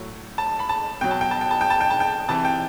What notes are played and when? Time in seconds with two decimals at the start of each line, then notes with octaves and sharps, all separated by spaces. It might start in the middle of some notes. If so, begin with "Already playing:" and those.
Already playing: A2 F#3
0.38 A5
0.59 B5
0.69 A5
1.01 B2 F#3 G5
1.11 A5
1.21 G5
1.31 A5
1.41 G5
1.51 A5
1.61 G5
1.70 A5
1.81 G5
1.91 A5
2.00 G5
2.28 C3 E3 A5
2.45 G5